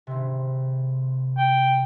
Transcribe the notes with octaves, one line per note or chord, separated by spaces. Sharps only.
G#1 C3
G5